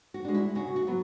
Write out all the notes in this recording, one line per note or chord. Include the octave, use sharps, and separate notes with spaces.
F#4
G#3 D4
E4
C#3 F#4
F#4
F#3 B3